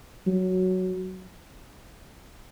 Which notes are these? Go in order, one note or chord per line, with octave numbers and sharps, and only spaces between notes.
F#3